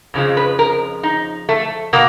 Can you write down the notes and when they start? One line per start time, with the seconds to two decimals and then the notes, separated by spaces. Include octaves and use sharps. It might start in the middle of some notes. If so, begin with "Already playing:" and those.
0.14 F2 C#3 F3 G#3
0.37 B4
0.59 A#4
1.03 D#4
1.49 A3
1.93 B2 A#3